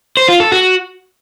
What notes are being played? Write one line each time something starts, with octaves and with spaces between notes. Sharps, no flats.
C5
F4
A4
F#4